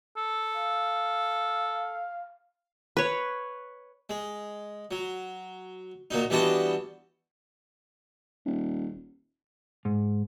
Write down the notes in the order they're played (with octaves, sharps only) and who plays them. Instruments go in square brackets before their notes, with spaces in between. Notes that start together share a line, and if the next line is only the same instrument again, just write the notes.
[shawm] A4
[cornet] F5
[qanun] B4 C#5
[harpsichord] G#3
F#3
A#2 F#3 D#4
E3 G3 B3 D4 F#4 D#5
[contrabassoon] D#1
[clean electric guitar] G#2